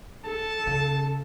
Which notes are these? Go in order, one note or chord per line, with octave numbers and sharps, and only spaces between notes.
A4 A5
C#3